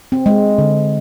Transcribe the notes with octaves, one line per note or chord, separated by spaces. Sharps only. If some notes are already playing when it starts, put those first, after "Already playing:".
C4
G#3
D3